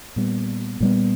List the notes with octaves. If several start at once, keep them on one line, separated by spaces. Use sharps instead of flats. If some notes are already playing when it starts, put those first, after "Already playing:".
A#2 G3 B3
A#2 G3 B3